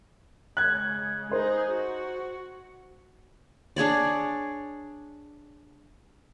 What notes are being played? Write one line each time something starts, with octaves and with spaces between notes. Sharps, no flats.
C#3 G#3 F#6 G#6
D#4 G#4 C5
F#4
D4 G#4 C#5 D5